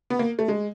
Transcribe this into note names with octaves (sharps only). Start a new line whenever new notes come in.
B3
A#3
A3
G#3